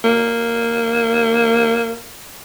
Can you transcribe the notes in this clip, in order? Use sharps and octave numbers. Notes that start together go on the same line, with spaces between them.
A#3